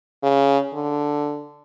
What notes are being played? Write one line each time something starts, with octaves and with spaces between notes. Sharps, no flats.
C#3
D3